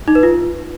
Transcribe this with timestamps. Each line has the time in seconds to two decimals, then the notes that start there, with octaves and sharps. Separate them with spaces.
0.08 D#4
0.15 B4
0.23 F4